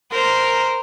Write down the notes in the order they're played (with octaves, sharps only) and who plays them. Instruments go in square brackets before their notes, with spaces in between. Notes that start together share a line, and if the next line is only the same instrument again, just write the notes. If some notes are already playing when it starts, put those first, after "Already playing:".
[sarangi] A#4 [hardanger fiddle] C5